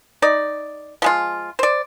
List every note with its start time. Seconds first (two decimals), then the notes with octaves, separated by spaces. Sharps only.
0.22 D#4 D5
1.02 F3 G#3 F4
1.59 C5 D5